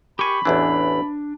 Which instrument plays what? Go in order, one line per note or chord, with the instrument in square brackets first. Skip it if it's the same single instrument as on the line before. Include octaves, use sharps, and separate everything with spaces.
[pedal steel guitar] G4 C#6 [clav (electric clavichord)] A#4 G#5 [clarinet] B5
[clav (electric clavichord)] A1 E2 E3 [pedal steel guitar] D4